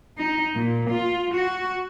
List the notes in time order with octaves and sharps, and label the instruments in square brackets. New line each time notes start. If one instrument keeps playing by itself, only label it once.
[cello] D#4
A#2
F4
F#4